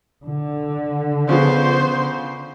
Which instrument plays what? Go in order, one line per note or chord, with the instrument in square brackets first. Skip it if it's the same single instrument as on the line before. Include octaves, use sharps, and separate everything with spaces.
[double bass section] D3
[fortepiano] C#3 F3 B3 [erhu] C5